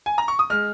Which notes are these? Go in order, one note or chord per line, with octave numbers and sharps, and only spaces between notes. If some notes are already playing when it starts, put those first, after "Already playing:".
G#5
A#5
C#6
D#6
G#3 F6